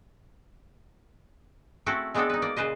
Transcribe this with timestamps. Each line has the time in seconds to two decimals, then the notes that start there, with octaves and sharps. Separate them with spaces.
1.86 A3 C4 C#4 E4 F#4 A4
2.14 G#3 B3 C4 D4 F#4 A4
2.30 D#4 B4
2.42 A#3 D5
2.56 A#2 C#3 B4 C5 D#5